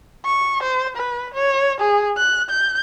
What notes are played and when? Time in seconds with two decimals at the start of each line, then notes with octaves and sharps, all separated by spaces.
0.25 C#6
0.63 C5
0.96 B4
1.33 C#5
1.80 G#4
2.17 F#6
2.50 G6